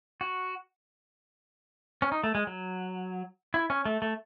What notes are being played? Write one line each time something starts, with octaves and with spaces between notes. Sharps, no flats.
F#4
C#4
D#4
A3
G#3
F#3
E4
C#4
A3
A3